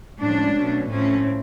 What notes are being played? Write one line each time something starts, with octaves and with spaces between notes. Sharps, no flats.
A2 F3 G#3 C#4 D4
B2 F#3 A3 C#4
A2 F3 A3 C4 C#4